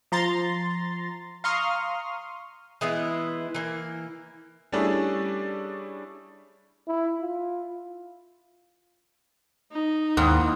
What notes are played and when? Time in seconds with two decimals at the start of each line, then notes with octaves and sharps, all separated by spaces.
0.12 F3 A#5 C6 A6
1.44 F5 A#5 C6 C#6 D#6 F6
2.81 E3 G#3 B3 E4
3.55 E3 A#3
4.72 G3 A3 C#4 D4 E4 G#4
6.87 E4
7.21 F4
9.72 D#4
10.17 D#2 G#2 D#3 A#3 E4